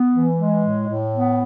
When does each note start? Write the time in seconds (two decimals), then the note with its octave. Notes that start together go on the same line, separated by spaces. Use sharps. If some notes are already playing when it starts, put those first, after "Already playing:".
Already playing: B3
0.11 E3
0.37 G#3
0.63 A2
0.87 A2
1.13 B3